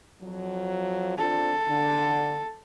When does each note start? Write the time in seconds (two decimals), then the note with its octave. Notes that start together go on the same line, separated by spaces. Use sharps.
0.21 F2 F3 F#3
1.18 C4 D4 F4 A4
1.68 D3